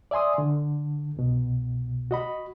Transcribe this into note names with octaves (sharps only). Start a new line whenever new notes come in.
D5 E5 G#5 C6 D#6
D3
C2 B2
F#4 D#5 B5